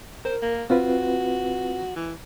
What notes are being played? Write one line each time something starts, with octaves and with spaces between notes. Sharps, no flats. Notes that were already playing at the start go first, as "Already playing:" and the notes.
A#4 C5
A#3
C4 F4 F#4 B4
E3